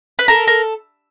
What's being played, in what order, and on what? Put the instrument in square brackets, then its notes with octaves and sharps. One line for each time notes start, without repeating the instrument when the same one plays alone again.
[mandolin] B4
A4 A#4
A#4